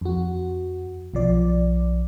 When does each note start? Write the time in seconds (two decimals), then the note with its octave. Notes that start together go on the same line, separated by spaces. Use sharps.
0.01 F2 F#4
1.14 B1 F3 D5